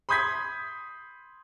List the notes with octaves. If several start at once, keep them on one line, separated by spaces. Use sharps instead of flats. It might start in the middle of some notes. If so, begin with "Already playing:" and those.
B5 C6 D#6 G6 G#6 B6